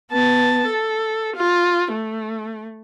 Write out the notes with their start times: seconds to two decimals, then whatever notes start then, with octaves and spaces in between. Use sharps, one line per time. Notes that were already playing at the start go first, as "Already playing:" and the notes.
0.11 B3 A5
0.67 A4
1.36 F4
1.92 A3